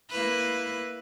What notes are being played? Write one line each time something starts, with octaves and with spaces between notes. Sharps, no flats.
A#3 E4 B4